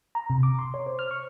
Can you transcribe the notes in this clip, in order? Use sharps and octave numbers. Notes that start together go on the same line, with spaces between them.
A#5
C3
D6
C6
C#5
C5
F6
C#6